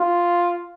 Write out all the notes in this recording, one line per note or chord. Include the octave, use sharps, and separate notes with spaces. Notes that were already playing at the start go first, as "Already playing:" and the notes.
Already playing: F4